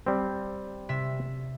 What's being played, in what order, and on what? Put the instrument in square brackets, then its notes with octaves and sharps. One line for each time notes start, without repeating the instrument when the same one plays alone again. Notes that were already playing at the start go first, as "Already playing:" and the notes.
[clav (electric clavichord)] G3 C4
[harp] C3 E5